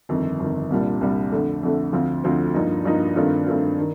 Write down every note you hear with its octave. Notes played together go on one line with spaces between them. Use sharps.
G1 F2 D#3
G1 F2 D#3
C2 A#2 G3 D4
C2 A#2 G3 D4
F2 D3 A3
F2 D3 A3
D2 D3 F3 C4 F4
D2 D3 F3 C4 F4
G2 F3 A#3 D#4
G2 F3 A#3 D#4
G2 D#3 A3 C4 F4
G2 D#3 A3 C4 F4
D#3